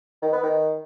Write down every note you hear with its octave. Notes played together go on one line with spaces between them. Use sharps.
D#3
B3
D#3